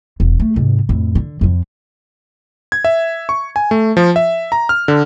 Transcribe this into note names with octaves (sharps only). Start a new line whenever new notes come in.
E1
A3
G#2 C3
F2 A2
D3
F2 F3
G#6
E5
C#6
G#5
A3
F3
E5
A#5
F6
D3